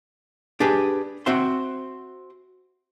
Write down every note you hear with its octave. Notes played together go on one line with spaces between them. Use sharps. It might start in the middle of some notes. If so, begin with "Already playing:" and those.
D4 G4 G#4 B4
C4 F#4 C5 E5 C6